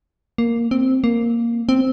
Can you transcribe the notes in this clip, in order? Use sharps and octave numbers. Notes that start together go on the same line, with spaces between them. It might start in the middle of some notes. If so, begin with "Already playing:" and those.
A#3
C4
A#3
C4